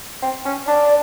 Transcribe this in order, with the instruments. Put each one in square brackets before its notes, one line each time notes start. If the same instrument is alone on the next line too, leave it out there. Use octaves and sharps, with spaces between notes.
[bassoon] C4
C#4
[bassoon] D4 [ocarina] D5